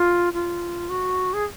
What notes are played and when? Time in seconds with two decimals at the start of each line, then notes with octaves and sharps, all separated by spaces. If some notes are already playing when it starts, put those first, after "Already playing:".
Already playing: F4
0.33 F4
0.89 F#4
1.33 G#4